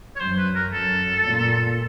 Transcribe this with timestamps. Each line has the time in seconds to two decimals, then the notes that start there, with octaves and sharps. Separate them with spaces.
0.16 C#5
0.20 F#2 C5
0.38 B4
0.55 A#4
0.73 F#2 A4
1.25 A#2